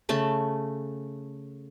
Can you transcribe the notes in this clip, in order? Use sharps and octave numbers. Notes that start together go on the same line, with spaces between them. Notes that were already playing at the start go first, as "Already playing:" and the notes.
C#3 A3 A5 B5